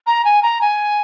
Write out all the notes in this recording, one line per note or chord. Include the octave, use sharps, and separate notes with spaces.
A#5
G#5
A#5
G#5